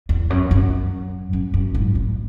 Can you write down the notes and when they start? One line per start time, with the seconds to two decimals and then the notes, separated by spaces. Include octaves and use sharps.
0.09 E2
0.30 F#2
0.51 F#2
1.33 F#2
1.54 F#2
1.75 G#2
1.95 A2